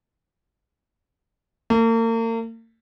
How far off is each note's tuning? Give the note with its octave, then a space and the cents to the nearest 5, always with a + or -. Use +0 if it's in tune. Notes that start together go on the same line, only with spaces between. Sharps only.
A#3 -40